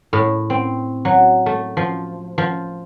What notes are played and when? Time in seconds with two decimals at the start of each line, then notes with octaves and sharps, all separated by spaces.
0.13 A2
0.50 C4
1.05 F#3
1.46 A3
1.77 F3
2.38 F3